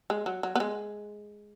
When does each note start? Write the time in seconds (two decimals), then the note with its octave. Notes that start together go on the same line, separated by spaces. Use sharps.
0.10 G#3
0.26 F#3
0.43 F#3
0.55 B3
0.60 G#3